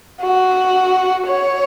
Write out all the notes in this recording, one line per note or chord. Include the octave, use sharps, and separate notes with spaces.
F#4
C#5